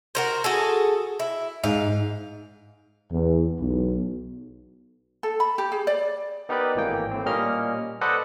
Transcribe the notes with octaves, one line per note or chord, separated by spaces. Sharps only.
F#4 A#4 C5
F#4 G#4 A4
E4
G#2 F5
E2
B1
A4
B5
G4
G#4
D5
B3 D#4 G4 A#4 B4 D5
G#1 A2 E3 A#3 G5
A2 C4
A#2 G3 A#3 C#4 D#5 F6
A4 B4 C5 D5 D#5 F#5